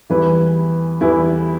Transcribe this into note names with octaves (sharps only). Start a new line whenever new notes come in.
E2 E3 G3 E4 B4
E2 E3 G3 E4 B4